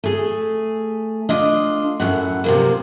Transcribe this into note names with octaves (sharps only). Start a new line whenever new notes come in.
A3 G#4
D4 F4 D#5
F#2 A2 F#5
C3 F3 A#3